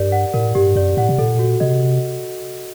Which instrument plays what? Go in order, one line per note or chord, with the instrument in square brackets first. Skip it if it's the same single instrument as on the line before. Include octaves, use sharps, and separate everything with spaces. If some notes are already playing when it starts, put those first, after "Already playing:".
Already playing: [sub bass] G2 [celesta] G4 A#4 D5
[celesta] F#5
[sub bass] A2 [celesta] A#4
[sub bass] G2 [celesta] G4
[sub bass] F#2 [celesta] D5
[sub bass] A2 [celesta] F#5
[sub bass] C3
[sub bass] A#2 [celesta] A4
[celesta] F#4
[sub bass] C3 [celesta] D#5